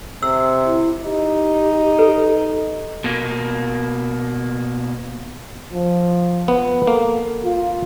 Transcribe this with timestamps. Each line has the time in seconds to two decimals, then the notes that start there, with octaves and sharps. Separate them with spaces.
0.23 C3 E6
0.65 E4
1.04 D#4 G4
1.99 A4 B4
3.04 B2 A#3
5.73 F3
6.48 B3
6.87 A#3 A4
7.45 F4